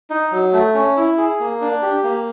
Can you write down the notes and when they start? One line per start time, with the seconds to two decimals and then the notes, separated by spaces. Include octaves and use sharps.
0.10 D#4
0.32 F#3
0.53 A3
0.74 C#4
0.96 E4
1.18 G#4
1.40 A#3
1.61 D4
1.82 G4
2.03 A#3